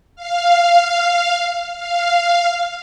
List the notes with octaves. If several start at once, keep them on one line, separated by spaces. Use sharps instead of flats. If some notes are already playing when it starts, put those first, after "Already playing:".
F5
F5